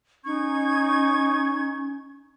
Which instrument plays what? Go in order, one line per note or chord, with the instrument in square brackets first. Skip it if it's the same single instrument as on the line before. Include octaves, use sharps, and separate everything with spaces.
[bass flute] C#4 [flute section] D#4 C#6 G#6